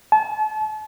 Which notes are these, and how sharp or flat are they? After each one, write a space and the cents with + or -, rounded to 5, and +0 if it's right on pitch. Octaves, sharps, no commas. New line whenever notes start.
A5 -35